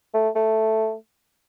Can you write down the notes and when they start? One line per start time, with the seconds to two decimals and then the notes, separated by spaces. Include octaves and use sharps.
0.14 A3
0.35 A3